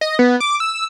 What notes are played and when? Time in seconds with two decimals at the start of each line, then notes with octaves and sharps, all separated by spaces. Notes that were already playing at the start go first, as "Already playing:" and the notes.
0.01 D#5
0.19 B3
0.40 D6
0.60 E6